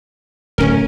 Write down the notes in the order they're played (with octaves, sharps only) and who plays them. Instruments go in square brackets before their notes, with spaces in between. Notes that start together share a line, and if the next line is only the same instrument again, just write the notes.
[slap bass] D1 [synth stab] C#4 A#4